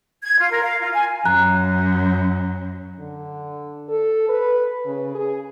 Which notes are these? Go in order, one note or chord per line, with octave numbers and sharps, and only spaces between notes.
G#6
F4
A#4
F5
F4
G#5
F#2 A#5 F#6
D3
A4
B4
C#3
G#4